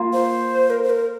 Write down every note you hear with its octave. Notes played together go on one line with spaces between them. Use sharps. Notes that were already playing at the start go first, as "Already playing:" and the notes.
Already playing: A#3 F4
C5
A#4
C5
A#4